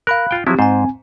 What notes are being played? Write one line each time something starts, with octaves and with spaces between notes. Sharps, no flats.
A#4 F5 B5 F#6
F4 G5
F3 F#3 C4 E4 G4
G#2 C4 C5 G#5